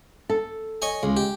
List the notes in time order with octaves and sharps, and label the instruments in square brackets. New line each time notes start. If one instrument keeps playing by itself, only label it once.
[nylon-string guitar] A4
[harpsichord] C#5 D#5 G#5
[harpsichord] C#2 [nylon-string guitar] G#3
[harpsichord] G4